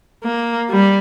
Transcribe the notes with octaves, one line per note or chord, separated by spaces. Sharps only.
A#3
G3